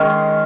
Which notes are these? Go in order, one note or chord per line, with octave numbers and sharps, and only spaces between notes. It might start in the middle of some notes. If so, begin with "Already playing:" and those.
Already playing: D#3 G#3 C#4